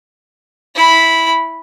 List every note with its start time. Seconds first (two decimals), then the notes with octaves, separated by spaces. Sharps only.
0.75 E4 B5